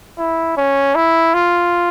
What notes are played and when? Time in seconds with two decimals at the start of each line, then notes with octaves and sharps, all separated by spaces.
0.18 E4
0.57 C#4
0.95 E4
1.34 F4